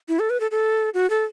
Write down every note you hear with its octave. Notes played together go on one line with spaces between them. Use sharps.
E4
A4
B4
A4
A4
F#4
A4